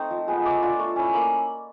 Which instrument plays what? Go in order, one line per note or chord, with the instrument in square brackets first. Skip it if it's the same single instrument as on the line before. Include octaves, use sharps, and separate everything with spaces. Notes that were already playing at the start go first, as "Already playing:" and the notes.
Already playing: [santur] A3 C4 D#4
F3
G#3 B3
A3 D6
D4 F4
A3 C#6
C#4 E4
A#3 B5